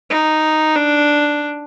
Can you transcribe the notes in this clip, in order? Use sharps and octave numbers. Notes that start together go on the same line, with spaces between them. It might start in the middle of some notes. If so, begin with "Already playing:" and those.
D#4
D4